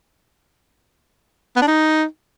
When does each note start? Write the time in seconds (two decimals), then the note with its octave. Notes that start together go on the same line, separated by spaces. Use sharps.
1.56 B3
1.62 D4
1.67 D#4